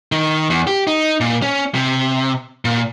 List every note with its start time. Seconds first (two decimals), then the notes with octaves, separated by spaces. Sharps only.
0.12 D#3
0.50 E2
0.67 G4
0.87 D#4
1.20 A#2
1.42 C#4
1.75 C3
2.65 A#2